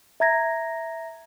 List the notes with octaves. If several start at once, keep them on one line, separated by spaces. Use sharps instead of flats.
E5 A#5 G#6 A#6